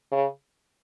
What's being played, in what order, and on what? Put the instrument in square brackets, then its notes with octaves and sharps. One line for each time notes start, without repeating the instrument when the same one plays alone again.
[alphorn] C#3